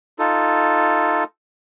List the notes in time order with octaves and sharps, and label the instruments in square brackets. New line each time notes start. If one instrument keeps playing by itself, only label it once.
[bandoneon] D#4 F4 A4